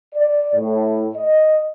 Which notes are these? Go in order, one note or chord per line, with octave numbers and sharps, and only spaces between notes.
D5
A2
D#5